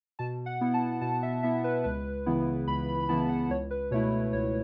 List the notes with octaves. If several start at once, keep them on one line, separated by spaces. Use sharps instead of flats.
B2 A5
F#5
B3 E4
A5
B2 A5
E5
B3 E4 E5
B4
C#2 B4
C#3 E3 B3 E4
C#2 B5
B5
B5
C#3 E3 B3 E4 A5
F#5
C#2 C#5
B4
B2 A3 E4 C#5
C#2 C#5